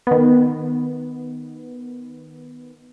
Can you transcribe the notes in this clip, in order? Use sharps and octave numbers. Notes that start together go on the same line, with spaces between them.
D#3 B3